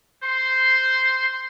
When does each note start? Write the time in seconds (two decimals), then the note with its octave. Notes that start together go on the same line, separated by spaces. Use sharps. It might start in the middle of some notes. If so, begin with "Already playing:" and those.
0.22 C5 C6